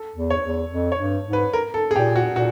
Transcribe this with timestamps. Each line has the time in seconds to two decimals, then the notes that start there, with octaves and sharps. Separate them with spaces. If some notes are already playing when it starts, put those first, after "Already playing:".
Already playing: A4
0.16 E2
0.30 C#5
0.44 E2
0.71 F2
0.92 C#5
0.99 G2
1.27 G#2
1.33 B4
1.53 A#4
1.74 A4
1.91 G#4
1.96 A#2 G4
2.16 F#4
2.36 A#2 F#4